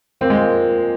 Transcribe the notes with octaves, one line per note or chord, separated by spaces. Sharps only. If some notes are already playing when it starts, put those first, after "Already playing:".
A#2 F3 A#3 C4
G#3